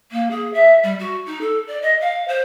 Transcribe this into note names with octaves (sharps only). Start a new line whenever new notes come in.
A#3
G#4
E5
G3
F#4
D#4
A4
D5
D#5
F5
C5